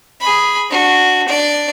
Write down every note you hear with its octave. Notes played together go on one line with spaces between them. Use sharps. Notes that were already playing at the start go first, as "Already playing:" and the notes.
G#4 B5
D4 F#4
D4 D5